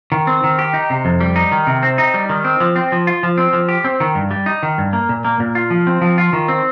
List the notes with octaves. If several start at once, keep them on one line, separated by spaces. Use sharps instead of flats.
D#3
C4
D#3
G4
D#4
C3
F2
G3
D#4
D#3
C3
C4
D#4
G3
D#3
C4
F3
C4
F3
F4
F3
C4
F3
G4
C4
D#3
G2
G3
D#4
D#3
G2
A#3
A#2
A#3
A#2
F4
F3
C4
F3
F4
D#3
C4